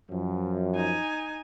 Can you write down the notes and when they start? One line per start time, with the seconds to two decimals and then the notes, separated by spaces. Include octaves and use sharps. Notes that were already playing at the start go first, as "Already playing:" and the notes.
0.11 F#2 F3
0.75 D#4 G#5